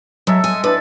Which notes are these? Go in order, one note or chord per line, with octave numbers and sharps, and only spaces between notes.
F#3 G#3 A4 E5
D#5 G#5
D4 E4 B4 A5